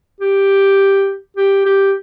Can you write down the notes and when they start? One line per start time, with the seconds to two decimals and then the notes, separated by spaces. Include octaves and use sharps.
0.21 G4
1.37 G4
1.66 G4